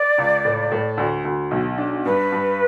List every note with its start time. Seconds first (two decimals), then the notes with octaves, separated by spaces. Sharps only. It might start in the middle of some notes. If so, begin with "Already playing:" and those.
Already playing: D5
0.18 C#2
0.45 A2
0.72 A2
0.97 D2
1.25 D2
1.51 B1
1.78 D4
2.05 G2 B4
2.32 G2